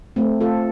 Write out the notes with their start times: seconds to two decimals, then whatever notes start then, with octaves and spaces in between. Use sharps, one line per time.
0.16 A3 C4
0.41 F4 A4